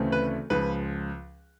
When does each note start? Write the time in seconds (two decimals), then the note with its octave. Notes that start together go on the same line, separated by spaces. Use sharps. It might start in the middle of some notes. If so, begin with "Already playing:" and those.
Already playing: D2 C#3 E3 A3 C4
0.12 B4
0.50 C#2 C#3 F3 B4